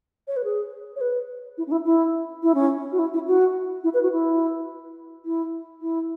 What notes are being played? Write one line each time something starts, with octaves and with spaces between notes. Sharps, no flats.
C#5
B4
G#4
C#5
B4
E4
C#4
E4
E4
E4
C#4
C#4
F#4
E4
E4
F#4
E4
B4
F#4
E4
E4
E4